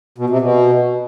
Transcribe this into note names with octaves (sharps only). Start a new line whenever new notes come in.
B2
C3
B2